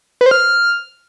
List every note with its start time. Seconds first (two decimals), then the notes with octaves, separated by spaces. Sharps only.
0.21 B4
0.26 C5
0.31 F6